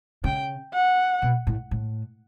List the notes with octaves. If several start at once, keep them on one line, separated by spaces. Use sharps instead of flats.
C#3 G5
F#5
B2
A2
A2